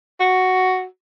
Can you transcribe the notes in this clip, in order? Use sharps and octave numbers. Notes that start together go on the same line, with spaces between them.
F#4